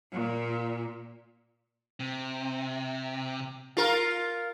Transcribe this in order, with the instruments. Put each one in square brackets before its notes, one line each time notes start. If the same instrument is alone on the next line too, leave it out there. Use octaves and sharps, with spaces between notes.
[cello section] A#2
[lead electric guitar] C3
[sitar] F4 A#4